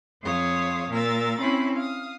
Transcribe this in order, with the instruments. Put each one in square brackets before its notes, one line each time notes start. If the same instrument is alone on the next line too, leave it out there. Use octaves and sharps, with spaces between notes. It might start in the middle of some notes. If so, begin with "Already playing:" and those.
[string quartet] F2 C5 C#5 F5 D#6
A#2 A#4 E6 A6
C4 C#4 E4 B5
F5 D#6